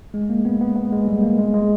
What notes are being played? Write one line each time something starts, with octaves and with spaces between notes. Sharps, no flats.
G#3
A#3
B3
B3
B3
G#3
G3
A#3
G#3
G#3